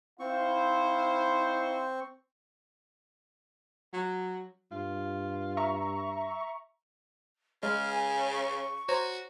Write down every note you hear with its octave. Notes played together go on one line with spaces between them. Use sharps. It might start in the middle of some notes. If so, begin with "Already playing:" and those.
C4 D#4 E4 C5 F5 C#6
F#3
G2 F4
E5 A#5 C#6
C#3 G#3 F6
G#5
C#6
F#4 C5 C#5 A#5